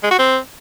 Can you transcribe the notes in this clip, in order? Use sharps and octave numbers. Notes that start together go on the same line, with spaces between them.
G#3
F#4
C4